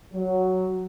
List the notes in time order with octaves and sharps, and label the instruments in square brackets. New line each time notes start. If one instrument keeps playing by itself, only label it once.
[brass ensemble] F#3